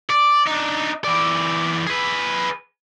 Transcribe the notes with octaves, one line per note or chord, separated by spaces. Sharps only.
D5
D4 D#4
E3 D5
G#4 B4